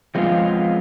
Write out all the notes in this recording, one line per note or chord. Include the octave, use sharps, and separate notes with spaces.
F3 G#3 B3 C4 F4